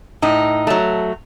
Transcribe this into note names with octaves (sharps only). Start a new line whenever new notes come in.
A2 D#4
F#3 A3